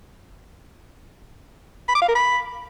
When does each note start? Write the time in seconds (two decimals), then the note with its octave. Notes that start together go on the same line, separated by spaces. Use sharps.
1.89 B5
1.95 D6
2.02 F5
2.08 A#4
2.15 B5